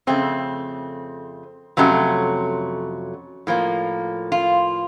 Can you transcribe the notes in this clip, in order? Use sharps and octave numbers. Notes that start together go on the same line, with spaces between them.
F2 C#3 A3 C4
F2 C3 F#3 A3 C#4
A2 F3 A#3
F4